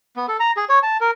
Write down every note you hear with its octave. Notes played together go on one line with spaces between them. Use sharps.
B3
A4
A#5
G#4
C#5
A5
A#4